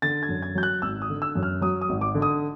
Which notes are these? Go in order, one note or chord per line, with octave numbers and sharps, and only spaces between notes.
D3 A6
G#6
F#2
G#6
F#3 G6
F#6
G#1 E6
D#6
D3
E6
F#2
F6
F#3 D#6
D#6
G#1
D6
D3
D#6